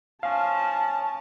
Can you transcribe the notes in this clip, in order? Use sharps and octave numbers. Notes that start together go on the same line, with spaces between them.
F3 C#4 F5 A5